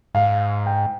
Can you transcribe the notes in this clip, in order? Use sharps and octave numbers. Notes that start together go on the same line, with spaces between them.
G#2 F5
G5